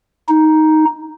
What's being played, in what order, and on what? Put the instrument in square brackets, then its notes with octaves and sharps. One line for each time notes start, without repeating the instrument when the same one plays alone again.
[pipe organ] D#4